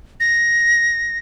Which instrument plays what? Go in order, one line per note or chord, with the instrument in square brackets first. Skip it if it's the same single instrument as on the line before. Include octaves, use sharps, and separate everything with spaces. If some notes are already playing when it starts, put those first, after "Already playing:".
[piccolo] A#6